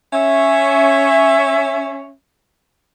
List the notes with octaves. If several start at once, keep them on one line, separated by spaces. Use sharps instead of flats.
C#4 E5